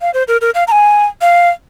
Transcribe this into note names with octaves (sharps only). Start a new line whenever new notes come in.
F5
C5
A#4
A#4
F5
A#5
G#5
F5